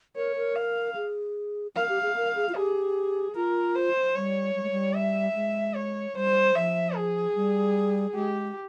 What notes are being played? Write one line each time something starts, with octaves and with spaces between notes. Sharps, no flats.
A#4 C#5
A#4
F5
G#4
A#4 F5
G4
G#4
A#4
G#4
F4
G4 G#4
F4 A#4
C5
G3 C#5
G3
G#3
G3
E5
G#3
C#5
G3 C5
F3 E5
G#4
G3
G#3 G4